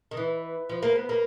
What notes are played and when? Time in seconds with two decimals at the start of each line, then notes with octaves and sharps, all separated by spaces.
0.11 D#3
0.17 E3 B4
0.69 F3
0.83 A#3
0.96 B3
1.09 A#3